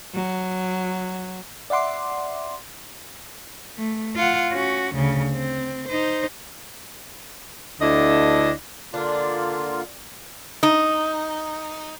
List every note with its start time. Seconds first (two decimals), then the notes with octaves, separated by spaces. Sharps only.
0.14 F#3
1.70 D5 E5 F#5 C6 D6
3.77 A3
4.15 F4 F#5
4.52 C#4 F#4
4.94 D2 C#3
5.32 C4
5.88 D#4 C5
7.81 D2 D3 D4 E4 D#5
8.94 D3 A#3 D4 F4
10.63 D#4